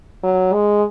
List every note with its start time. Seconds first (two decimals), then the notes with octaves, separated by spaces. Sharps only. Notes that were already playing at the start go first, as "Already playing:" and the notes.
0.23 F#3
0.53 G#3